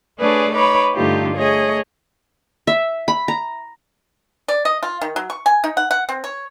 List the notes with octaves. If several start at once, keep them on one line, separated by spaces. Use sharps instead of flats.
A3 D4 G#4 B4 C#5 D5
D#4 B4 C#5 B5 D6
G2 D3 A3 D#4 F4 G4
A3 G#4 C#5 D#5
E5
B5
A#5
D5
D#5
F4
D#3
F#3
C#6
G#5
D#4
F#5
F#5
C4
C#5